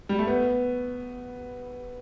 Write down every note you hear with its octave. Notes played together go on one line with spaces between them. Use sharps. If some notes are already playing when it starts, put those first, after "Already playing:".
G3
A3
B3